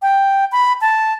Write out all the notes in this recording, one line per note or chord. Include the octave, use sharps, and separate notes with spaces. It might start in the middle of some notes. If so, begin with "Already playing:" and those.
G5
B5
A5